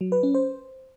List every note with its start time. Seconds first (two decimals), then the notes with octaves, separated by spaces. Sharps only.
0.01 F#3
0.12 B4
0.23 C#4
0.34 C5